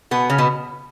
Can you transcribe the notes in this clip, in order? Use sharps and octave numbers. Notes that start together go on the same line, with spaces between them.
B2 B3
C#3 C#4
B2 B3